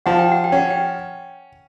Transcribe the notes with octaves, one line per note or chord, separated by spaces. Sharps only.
F3 F#5
G5
F#5
G5
C#4 F#5
G5